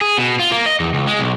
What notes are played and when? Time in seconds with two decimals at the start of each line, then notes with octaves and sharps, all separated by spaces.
0.01 G#4
0.17 B2
0.39 F4
0.52 A#3
0.66 D#5
0.80 E2
0.94 C#2
1.07 G#3
1.19 B1